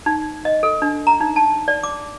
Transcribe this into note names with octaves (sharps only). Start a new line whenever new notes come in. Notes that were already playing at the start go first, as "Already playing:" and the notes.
D#4
D#5
A4
D4
A#5
D#4
A5
D5
D6